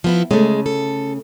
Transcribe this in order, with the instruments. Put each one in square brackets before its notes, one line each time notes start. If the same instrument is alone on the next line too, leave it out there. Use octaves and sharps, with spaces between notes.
[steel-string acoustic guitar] F3 B3 E4
[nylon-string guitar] C#3 A3 [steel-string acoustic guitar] G#3
[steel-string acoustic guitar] A4